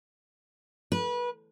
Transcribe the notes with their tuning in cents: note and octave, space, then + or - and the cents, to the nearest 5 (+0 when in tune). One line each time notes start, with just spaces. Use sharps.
B4 -25